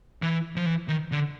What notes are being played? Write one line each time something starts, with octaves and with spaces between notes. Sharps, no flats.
E3
F3
E3
D#3
D3